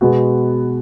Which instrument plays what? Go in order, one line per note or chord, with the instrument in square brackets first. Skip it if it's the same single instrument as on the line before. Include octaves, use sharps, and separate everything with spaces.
[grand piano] B2 G#3 B3 F#4